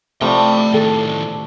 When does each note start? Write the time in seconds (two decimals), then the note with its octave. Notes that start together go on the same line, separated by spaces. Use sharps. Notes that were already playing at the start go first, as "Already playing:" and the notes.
0.21 C3 F3 A3 C4 D5 G5 B5
0.74 A2 D#3 A4